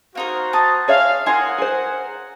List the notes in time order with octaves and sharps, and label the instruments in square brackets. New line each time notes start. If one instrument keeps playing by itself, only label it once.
[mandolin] A#3 D#4 A#4 [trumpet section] F#4 C5
[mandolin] A5 D#6
[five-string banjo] G#4 C#5 E5 [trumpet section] F5
[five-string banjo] E4 [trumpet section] A#4 F#5 [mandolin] D#5 G#5 C6
[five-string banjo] G#4 C5